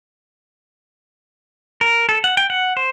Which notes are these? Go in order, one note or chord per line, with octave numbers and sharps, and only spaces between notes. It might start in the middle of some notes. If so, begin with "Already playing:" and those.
A#4
A4
F#5
G5
F#5
C5